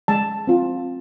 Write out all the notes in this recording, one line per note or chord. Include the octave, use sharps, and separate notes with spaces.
G#3 A5
C4 F4